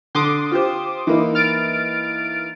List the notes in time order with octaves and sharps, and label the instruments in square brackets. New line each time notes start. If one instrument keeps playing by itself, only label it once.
[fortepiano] D3 [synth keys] C6 D6 D#6
[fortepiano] F4 G4 C5
E3 A#3 D#4
[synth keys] F6 A6 D7